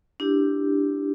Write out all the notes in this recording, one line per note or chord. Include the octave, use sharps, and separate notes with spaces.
D4 E4 G4